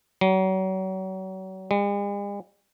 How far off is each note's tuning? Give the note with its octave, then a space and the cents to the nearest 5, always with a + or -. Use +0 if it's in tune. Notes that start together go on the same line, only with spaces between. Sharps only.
F#3 +35
G#3 -45